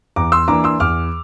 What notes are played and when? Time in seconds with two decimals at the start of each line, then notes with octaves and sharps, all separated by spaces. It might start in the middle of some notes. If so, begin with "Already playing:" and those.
0.16 E2 A#5 D6
0.32 C6 E6
0.48 E3 A#3 D4 A#5 D6
0.64 C6 E6
0.80 E2 D6 F6